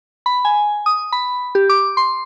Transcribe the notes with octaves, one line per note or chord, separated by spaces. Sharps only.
B5
G#5
D#6
B5
G4
D6
C6